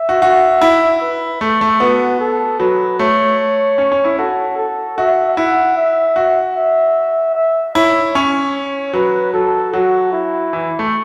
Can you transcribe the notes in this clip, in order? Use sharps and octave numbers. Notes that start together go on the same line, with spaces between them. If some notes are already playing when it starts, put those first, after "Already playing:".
Already playing: E5
F#4
F#4
E4
B4
A3 A4
A3
B3 F#4
A4
F#3 B4
A3 C#5
C#4
C#4
E4
F#4 A4
A4
F#4 E5
E4 F#5
E5
F#4
E5
E5
E4 C#5
C#4
F#3 B4
F#3 A4
F#3 F#4
E4
E3
A3